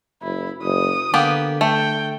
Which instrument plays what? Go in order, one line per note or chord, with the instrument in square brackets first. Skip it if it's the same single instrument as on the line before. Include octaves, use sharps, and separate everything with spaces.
[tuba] F#1 [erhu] E4
[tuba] F#1 [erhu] D#6
[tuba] D3 [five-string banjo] A#3 B3 G4
[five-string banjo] A3 [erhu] G5